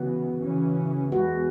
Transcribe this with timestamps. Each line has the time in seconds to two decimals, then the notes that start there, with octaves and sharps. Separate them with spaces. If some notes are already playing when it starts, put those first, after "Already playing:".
Already playing: C#3 E3 B3 F#4
0.39 C#3 E3 C#4
1.12 E2 E3 G#3 B3 F#4